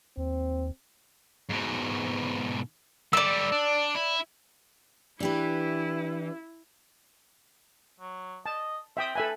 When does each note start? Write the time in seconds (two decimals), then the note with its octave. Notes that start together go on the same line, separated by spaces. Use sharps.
0.17 D#2 C4
1.49 G#2 B2
3.13 G3 A4 D5 E6
3.52 D4
3.95 E4
5.20 E3 D4 E4 G4 B4
8.00 F#3
8.46 D#5 A5
8.97 C4 E5 G5 D#6
9.15 A4 B4 E5 G#5